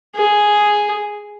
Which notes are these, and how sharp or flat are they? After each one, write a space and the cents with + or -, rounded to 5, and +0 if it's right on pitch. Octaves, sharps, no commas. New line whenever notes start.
G#4 +0